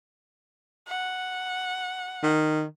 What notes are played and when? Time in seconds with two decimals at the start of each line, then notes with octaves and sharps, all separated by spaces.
0.88 F#5
2.23 D#3